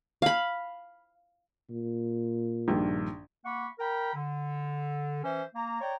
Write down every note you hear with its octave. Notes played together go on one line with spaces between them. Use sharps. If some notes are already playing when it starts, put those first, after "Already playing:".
F5 B5
A#2
A#1 G2 D#3
A#3 F#5 B5 C#6
A#4 G5 A#5 B5
D3
E3 C#4 C5 E5
A#3 A#5
C#5 D5 G5 A#5